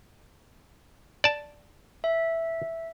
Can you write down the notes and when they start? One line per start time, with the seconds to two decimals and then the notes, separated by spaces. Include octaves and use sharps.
1.24 D5 A5
2.04 E5